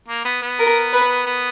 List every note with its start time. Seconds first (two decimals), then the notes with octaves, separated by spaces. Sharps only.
0.08 A#3
0.25 B3
0.42 B3
0.59 A#4
0.93 B4
1.26 B3